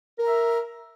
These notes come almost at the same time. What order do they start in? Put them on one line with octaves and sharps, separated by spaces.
A#4 A#5 E5